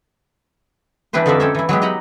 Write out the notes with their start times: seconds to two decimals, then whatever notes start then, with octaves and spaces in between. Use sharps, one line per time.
1.13 E3 D4 E4 G4 B4 C5
1.26 F2 D3 D#4 F4 D5 E5
1.40 C#4 G4 A4 C5 C#5 E5
1.55 E3 E4
1.69 F#3 G#3 B3 G4
1.82 D#4 G4 D#5 F#5 A#5 B5